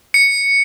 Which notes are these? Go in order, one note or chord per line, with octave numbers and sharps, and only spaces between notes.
C#7